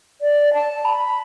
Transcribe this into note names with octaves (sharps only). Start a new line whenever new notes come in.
D5
A5
B5